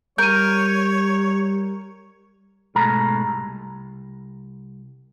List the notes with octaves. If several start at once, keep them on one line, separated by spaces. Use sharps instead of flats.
G3 A#4 C#5 G6 D#7
G#2 B2 G#3 A3 A#5 B5
C2